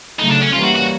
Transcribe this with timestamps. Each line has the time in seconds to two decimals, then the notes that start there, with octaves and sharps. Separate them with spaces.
0.19 C#3 F#3 A3 D#4
0.30 D4
0.42 C#4
0.53 E3 G3 A#3 C#4 F4
0.64 F#4
0.75 F#4